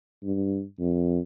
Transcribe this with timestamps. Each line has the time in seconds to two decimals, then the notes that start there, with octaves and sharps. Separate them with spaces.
0.23 G2
0.80 F2